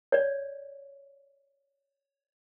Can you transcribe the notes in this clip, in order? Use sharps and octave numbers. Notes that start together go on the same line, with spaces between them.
C#5 D5